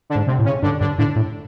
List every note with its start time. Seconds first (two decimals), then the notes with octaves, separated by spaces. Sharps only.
0.10 D3 D4
0.15 G#2
0.27 C3 C4
0.39 A2
0.45 C#3 C#4
0.62 G2 D3 D4
0.80 G2 D3 D4
0.98 A2 D3 D4
1.16 A2